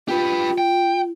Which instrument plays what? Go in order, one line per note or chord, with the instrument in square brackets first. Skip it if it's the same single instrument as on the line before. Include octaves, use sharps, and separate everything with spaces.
[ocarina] F4 [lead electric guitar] G4 B4
[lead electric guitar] G5